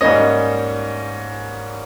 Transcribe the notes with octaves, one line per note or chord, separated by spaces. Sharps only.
G#2 G3 A#3 C#4 D#5